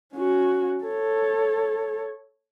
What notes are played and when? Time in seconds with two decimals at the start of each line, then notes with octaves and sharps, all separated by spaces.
0.14 C#4 F#4
0.84 A4 C#5